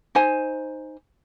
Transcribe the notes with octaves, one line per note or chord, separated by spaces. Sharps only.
D#4 C5 G#5